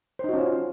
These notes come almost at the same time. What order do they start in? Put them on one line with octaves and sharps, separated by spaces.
C5 D#4 F#4 C#4 F4